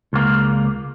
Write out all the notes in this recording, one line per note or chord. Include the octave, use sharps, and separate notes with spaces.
C#2 A#3